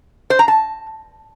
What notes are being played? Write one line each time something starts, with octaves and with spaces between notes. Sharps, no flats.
C5
A#5
A5